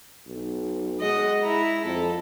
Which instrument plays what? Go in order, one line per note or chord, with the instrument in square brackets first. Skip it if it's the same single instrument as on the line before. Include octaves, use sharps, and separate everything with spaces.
[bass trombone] B1
[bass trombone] G#3 [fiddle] D#5 F#5
[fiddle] E4 A#5
[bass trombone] F2 [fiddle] A4